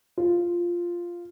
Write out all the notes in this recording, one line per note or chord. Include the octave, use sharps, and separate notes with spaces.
F4